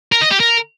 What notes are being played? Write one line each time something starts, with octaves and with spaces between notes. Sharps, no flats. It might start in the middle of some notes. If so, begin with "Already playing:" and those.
A#4
D#5
G4
A#4